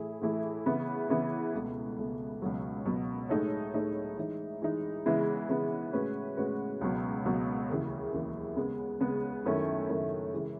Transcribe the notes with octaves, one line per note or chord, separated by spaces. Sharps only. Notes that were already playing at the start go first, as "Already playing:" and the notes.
Already playing: A2 E3 A3 E4 G#4
A2 E3 A3 E4 G#4
C#3 E3 B3 E4
C#3 E3 B3 E4
C#2 B2 A3
C#2 B2 A3
C#2 B2 F#3
C#2 B2 F#3
A2 G#3 D#4 A4 C#5
A2 G#3 D#4 A4 C#5
E3 G#3 D#4
E3 G#3 D#4
C#3 E3 G#3 B3 E4
C#3 E3 G#3 B3 E4
A2 G#3 C#4 F#4 B4
A2 G#3 C#4 F#4 B4
C#2 B2 F#3
C#2 B2 F#3
D#2 C#3 E3
D#2 C#3 E3
C#3 G#3 B3
C#3 G#3 B3
F#2 D#3 A3 C#4 E4
F#2 D#3 A3 C#4 E4
C#3 E3 G#3